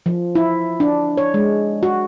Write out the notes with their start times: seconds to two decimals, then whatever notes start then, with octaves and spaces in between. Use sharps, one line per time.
0.06 F3
0.35 E4
0.80 D4
1.18 C#5
1.34 G#3
1.83 F#4